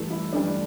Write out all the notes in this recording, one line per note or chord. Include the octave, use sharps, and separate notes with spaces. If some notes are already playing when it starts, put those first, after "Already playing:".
Already playing: G2 E3 A3
E4
G2 E3 A3 D4